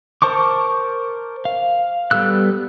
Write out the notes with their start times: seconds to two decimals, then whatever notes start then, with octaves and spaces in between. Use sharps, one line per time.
0.22 A#4 C5 A5 C#6 D6
1.45 F5
2.11 G3 B3 A4 E6 F#6